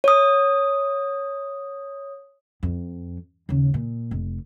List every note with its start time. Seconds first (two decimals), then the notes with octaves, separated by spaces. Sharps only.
0.04 C#5 D#6
2.63 F2
3.49 D#2 C#3
3.74 A#2
4.11 F1